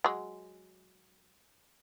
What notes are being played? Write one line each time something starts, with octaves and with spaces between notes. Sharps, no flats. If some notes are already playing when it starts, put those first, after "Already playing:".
F#3 G#3